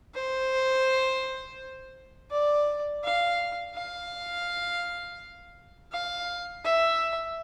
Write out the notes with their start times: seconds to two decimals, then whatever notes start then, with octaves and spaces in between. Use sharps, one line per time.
0.15 C5
2.31 D5
3.04 F5
3.75 F5
5.92 F5
6.64 E5